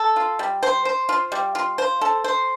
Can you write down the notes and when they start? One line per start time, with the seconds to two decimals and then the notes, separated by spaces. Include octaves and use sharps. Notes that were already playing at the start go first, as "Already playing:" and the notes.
Already playing: A4
0.16 F4
0.39 G3
0.63 C5
0.85 C5
1.09 F4
1.32 G3
1.55 F4
1.78 C5
2.01 A4
2.24 C5